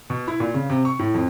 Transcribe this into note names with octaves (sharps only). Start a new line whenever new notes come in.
B2
E4
A#2
C#3
C3
C#6
A2
F2